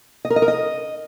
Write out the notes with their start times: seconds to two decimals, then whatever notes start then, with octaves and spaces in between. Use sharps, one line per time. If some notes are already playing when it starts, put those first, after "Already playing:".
0.25 D#5
0.30 A#4
0.36 D#5
0.42 A#4
0.48 D#5